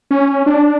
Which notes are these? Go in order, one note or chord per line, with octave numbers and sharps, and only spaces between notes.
C#4
D4